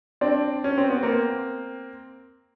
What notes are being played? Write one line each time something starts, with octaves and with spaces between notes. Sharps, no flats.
C4 D4
C#4
C4
B3
A#3 C4